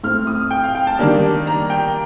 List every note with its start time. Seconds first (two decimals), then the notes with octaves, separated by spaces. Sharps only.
0.04 A2 A3 C4 F6
0.27 D#6
0.51 G5
0.64 F5
0.75 G5
0.87 A5
0.99 D#3 G3 A#3 D4
1.47 A#5
1.70 G5